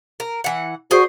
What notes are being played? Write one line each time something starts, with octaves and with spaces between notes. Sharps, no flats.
A#4
E3 F#5
F#4 G#4 C5 D5